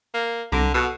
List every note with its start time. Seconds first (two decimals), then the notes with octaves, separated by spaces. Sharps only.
0.14 A#3
0.52 C2 D3 A#5 D6
0.74 B2 F#4 A4 E6